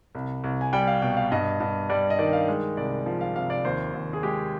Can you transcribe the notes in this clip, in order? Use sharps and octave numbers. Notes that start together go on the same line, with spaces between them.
C2
C2
G#5
G3 G5
F5
B2 G5
F5
G2 D#5
G2
G3 D5
D#5
D#3 D5
F5
G#3
C2 D5
F3
F5
C3 F5
D5
D#2 C5
D#2
G#4
G#3 G4